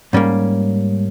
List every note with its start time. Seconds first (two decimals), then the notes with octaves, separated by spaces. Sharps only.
0.13 G#2 G3 A#3 C#4